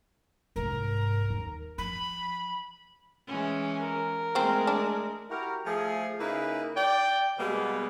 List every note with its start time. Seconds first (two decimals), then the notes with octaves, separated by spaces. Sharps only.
0.56 C2 G#2 A#4
1.30 D#2
1.78 F3 B5
3.27 E3 G#3 C#4
3.82 A#4
4.35 F3 G#3 A3 C4
4.67 D4
5.30 E4 F#4 G4 A#4
5.66 F3 A3 G#4
6.20 C#3 A#3 D#4 E4 G#4 B4
6.76 D5 G5
7.39 B2 G3 G#3 A#3 B3